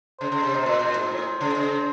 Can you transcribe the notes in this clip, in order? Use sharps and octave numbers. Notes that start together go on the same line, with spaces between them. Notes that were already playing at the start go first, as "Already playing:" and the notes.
C#3 C5
C#3
C3
B2
A#2 C5
A#2
G#2
A2 C5
C#3
C#3